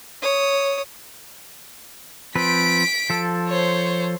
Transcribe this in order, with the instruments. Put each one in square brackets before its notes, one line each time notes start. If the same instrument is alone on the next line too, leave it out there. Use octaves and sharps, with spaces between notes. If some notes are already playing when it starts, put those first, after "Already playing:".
[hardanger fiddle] C#5 D#6
[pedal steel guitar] F3 C4 B4 [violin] B6 D7
[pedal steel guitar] F3 A4
[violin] C5 C#5